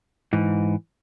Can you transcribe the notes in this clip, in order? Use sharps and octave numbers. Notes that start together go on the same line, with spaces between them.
G#2 E3